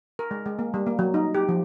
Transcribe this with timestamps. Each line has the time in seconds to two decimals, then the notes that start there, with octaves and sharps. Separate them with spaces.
0.19 A#4
0.31 G#3
0.46 G#3
0.59 A#3
0.74 G3
0.87 A#3
0.99 F#3
1.14 D#4
1.35 G4
1.49 F3